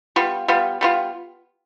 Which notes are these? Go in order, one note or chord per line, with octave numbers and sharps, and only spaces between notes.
G3 B3 F4
G3 B3 F4
G3 B3 F4